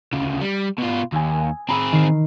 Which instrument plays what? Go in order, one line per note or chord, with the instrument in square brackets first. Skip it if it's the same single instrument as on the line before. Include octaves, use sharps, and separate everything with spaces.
[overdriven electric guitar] D2 C#3
G3
B2 F4
[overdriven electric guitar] D#2 [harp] G#5 D#6 E6
[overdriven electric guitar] C4 G#4 [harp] A#5 B5 E6
[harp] D#3 C7